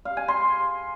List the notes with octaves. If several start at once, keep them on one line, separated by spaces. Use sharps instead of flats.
F5
G#5
C6